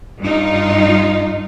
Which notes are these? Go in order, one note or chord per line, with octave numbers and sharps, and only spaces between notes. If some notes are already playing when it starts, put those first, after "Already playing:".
G2 D#4 F4